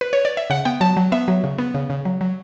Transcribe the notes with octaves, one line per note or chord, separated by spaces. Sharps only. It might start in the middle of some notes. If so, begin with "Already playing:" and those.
B4
C#5
D5
E5
C#3 F#5
B3 G5
F#3 A5
F#3
B3 E5
F#3
C#3
B3
C#3
C#3
F#3
F#3